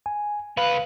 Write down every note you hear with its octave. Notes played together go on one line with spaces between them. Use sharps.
G#5
C#2 B4 F5